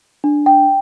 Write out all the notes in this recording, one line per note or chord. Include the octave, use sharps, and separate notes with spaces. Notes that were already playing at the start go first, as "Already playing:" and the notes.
D4
G5